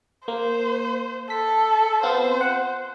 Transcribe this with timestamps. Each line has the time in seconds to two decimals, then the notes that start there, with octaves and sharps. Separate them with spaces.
0.28 A#3 C5
1.30 A4 B6
2.03 B3 C4 F4 C5
2.41 F#5